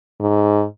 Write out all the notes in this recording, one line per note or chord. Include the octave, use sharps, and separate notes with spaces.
G#2